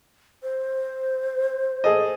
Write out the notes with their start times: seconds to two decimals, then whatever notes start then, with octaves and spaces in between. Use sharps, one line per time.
0.43 C5
1.84 G#4 A4 D#5